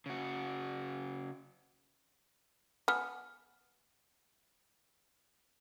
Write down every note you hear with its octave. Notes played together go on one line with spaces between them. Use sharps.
C#3 F#4
B3 G#5 F6